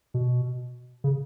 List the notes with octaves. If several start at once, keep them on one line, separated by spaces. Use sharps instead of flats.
B2
C#3